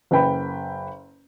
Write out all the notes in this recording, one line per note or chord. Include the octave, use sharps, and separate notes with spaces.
F#1 B4 G5 B5